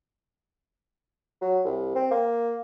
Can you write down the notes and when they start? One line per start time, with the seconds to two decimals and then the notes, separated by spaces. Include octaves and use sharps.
1.42 F#3
1.65 C2
1.95 C4
2.11 A#3